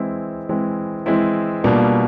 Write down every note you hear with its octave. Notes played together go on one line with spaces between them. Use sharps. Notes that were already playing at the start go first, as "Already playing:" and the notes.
Already playing: E3 G#3 C4 E4
E3 G#3 C4 E4
E3 G#3 C4 E4
B2 G3 A#3 D4 F4